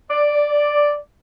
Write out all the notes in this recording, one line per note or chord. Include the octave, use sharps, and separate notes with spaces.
D5